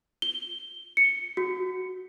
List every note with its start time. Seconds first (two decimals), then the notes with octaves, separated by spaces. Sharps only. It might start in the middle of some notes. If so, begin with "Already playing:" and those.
0.22 G7
0.97 C#7
1.37 F#4